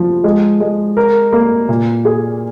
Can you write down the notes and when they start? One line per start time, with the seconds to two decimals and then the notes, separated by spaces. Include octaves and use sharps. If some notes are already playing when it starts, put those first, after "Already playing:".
Already playing: F3
0.24 G#3
0.60 G#3
0.97 A#4
1.32 A#3
1.69 A#2
2.05 G#4